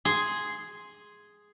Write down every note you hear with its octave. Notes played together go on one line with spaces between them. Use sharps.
G#4 C6